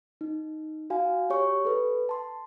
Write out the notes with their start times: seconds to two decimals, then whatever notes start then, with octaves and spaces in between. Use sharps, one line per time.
0.21 D#4
0.90 F#4 F5 G#5
1.30 G4 C#5 C#6
1.65 A4 B4
2.09 A5 C6